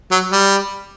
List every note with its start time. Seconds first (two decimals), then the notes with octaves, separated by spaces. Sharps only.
0.12 F#3
0.32 G3